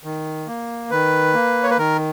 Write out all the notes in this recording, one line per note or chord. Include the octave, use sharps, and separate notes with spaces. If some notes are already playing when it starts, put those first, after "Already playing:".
D#3
A#3
D#3 B4
A#3
C#5
B4
D#3 A#4